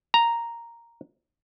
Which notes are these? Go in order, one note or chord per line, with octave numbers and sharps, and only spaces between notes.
A#5